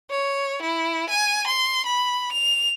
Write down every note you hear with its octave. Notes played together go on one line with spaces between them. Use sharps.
C#5
E4
G#5
C6
B5
F7